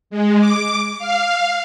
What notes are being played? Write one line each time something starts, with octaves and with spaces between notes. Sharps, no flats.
G#3
D6
F5